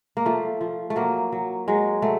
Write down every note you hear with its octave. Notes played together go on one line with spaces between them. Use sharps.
A#3
F3 A3
F3
A3
F#3 A#3
F#3
F#3 G#3
F#3 A3